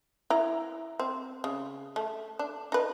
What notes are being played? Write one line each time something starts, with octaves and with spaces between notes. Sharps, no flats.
E4 A#5
C4
C#3
A3
D4
D#4 B4